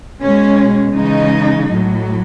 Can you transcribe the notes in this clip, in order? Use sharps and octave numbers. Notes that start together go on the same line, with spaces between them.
B2 G#3 C#4
C#3 E3 G#3 D#4
A2 F#3